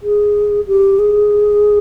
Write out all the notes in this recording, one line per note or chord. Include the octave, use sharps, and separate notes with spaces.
G#4
G4
G#4